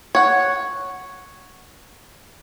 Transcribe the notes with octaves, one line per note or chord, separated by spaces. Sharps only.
C#5 F#5